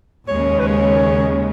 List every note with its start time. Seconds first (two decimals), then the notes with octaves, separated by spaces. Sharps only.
0.28 D#2 C#3 G#3 C#5
0.59 B4
0.67 C#5